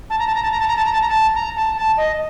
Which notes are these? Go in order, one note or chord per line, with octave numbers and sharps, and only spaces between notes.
A5
A#5
A5
A#5
A5
A#5
A5
A#5
A5
A#5
A5
A#5
A5
A#5
A5
A5
D#5